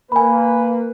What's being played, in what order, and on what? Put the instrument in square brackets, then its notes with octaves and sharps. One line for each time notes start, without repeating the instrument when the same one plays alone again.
[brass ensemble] A#3 B4 [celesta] G#5 B5